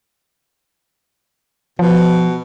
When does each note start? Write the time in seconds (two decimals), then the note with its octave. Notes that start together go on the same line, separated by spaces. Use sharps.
1.79 B2 F3